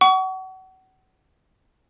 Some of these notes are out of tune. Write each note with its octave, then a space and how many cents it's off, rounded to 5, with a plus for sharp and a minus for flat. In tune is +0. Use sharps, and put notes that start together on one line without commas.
F#5 +30 C#6 +35